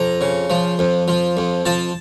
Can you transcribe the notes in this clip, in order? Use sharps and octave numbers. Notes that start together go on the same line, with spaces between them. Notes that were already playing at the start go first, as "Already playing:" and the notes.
Already playing: F2 A#5
C#3
F3
F2
F3
F2
F3 A5